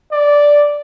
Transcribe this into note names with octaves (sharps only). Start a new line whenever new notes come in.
D5